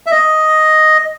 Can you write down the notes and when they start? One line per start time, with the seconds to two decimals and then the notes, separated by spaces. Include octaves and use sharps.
0.06 E5
0.11 D#5